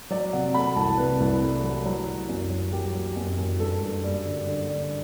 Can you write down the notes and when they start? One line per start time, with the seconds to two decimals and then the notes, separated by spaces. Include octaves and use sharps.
0.10 F#3 D5
0.33 C3 F#5
0.54 A3 B5
0.76 C2 A5
0.98 C3 B4
1.20 C2
1.42 A3
1.64 F#3
1.86 F#3
2.07 F#3
2.29 F#2
2.50 F#3
2.73 F#3 G4
2.95 F#3
3.16 F#2
3.38 F#2
3.59 G2 A4
3.81 G2
4.04 G3
4.25 D3
4.47 D3
4.69 G3